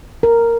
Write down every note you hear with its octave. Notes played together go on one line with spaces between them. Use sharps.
A#4